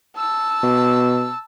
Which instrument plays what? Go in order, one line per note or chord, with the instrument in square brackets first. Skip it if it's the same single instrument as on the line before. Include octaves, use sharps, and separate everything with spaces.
[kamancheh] A5 E6
[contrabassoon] B2